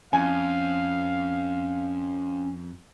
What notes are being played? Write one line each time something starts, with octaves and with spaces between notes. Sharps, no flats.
F2 C#4 F5 G#5